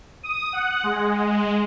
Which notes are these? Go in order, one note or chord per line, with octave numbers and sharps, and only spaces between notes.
D#6
F#5
G#3